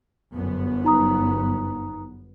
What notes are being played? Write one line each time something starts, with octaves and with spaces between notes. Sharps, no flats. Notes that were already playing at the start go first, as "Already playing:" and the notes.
G1 F#2 B3
D#4 A#5 D#6